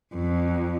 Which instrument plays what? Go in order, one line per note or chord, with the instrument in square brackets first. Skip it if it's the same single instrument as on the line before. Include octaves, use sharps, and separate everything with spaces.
[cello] F2